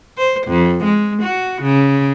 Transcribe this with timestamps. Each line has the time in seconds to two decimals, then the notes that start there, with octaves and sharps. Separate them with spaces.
0.18 C5
0.47 F2
0.85 G#3
1.23 F#4
1.62 C#3